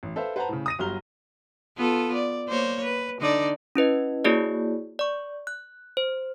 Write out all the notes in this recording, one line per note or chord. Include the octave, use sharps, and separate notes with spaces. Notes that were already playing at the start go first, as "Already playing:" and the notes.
A1
A4 B4 C5 E5 F5
B4 C5 F#5 A5 A#5
A2 C#3
D#6 A#6 D#7
G1 F#3 G3 A#5 F6 G7
B3 F4 A4
D5
A#3 C5 C#5
B4
D3 D#4 D5
C#4 E4 B4 D#5
A#3 E4 F#4 G#4 C#5 D5
D5 C#6
F#6
C5